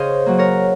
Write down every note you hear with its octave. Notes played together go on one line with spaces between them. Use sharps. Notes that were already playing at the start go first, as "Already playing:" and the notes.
Already playing: C#3 G#4 C5 D#5 F5
F#3 A#3
A#4 C#5